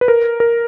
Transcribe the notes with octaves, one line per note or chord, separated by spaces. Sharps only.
B4
A#4
A#4